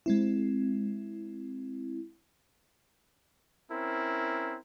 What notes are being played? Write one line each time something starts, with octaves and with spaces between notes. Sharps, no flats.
G#3 C4 E4
C4 C#4 E4 A#4